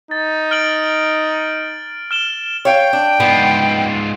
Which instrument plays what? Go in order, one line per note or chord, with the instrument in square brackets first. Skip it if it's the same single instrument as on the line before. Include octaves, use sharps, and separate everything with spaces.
[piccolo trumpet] D#4 [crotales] A6
[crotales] F6 D7 F#7
F6 E7 G7
[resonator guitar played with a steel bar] C#5 F5 [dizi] G5
[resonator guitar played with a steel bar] D4
[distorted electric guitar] G#2 F4 [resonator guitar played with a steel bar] B3